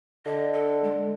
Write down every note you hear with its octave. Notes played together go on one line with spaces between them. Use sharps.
D3 D#5
A4
G#3